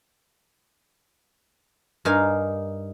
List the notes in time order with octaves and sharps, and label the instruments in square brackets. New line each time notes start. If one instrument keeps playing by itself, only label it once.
[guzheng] G2 D#4 A#4 F5 G#5